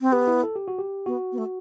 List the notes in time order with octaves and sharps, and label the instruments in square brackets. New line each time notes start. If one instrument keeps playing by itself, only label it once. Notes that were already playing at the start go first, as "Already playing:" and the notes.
[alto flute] C4
[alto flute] B3 [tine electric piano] G4
[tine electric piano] E4
A4
G4
F#4
G4
[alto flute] B3 [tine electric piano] F#4
[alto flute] B3
A3